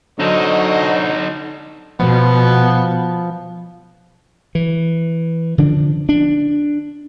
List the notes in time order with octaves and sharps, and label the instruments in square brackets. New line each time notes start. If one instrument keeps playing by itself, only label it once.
[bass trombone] D3 [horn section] F#3 C5 D#5 [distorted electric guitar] D#4 A4
[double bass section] B2 [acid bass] F3 [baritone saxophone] B3
[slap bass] E3
D3 F3 D4
D4